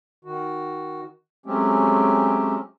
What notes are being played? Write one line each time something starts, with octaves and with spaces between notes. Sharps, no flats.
D#3 F#4
F#3 G#3 A3 C4 C#4 G4